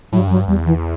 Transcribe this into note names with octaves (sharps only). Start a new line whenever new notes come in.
A2 F#3
G2
F#2
F#3
G2
E2 G3
E3